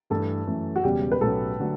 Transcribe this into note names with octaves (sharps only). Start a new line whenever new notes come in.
G2 E3 A3 A4
F#2 E3 A3
F#4
E1 E2 C#3 G3 G4
B4
B1 A2 F#3 C#4 A4
D3 F#3 A3